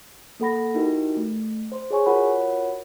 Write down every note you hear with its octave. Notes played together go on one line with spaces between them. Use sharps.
A#3 A4 F#5 B5 A#6
D#4 E4 F#4 G4 A#4
A3
C5 C6
G#4 C#5 G#5 C#6
F4 F#4 A#4 C#5 F#5 B5